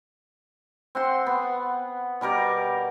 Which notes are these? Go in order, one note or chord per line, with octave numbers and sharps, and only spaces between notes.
C4 F#5 C6
B3
B2 G3 A#4 D6